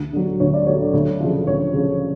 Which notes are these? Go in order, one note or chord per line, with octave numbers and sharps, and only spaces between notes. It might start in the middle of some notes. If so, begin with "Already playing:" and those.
Already playing: D2
D3 F#3
D2 C#5
D5
D3 F#3 C#5
D2
C#3 F3
D2 C#5
C#3 F3